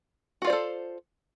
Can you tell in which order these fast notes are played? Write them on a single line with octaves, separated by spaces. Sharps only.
F#4 F4 D5 C5 A4